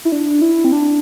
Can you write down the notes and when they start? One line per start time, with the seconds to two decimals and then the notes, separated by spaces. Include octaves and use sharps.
0.05 E4
0.12 D4
0.42 E4
0.65 C4
0.72 D4